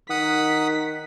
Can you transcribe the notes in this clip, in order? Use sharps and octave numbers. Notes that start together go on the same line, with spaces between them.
D#3 F#5 D#6 B6